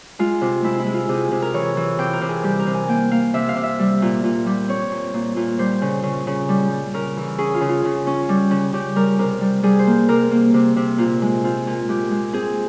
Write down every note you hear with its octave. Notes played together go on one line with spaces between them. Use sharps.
G#3 F4
C3
G#3 E4
E4
G#3
F4
C3 G#4
C3
A#4
E3 C#5
E3
C3 G5
A#4
C3
G#4
G3 G4
A#4
C3
G#5
A#3 G5
A#3 F5
C3 E5
F5
C3
E5
G3
A#2
A#2
G3
C4 C#5
A#2
A#2
A#2
G3 C5
C#3
C#3
C#3
G3
G3
C#3 A#4
E3
C#4 G#4
F4
C#3
F4
C#3
C#4
G3
C#3
C#3 G4
G3 A#4
C3 A#4
G3
G3 G#4
C5
A#3
C3 A#4
A#3
C3
C3
A#2 F4
G#3
C4 F4
A#2
G#3 G4
G#3
C4 G#4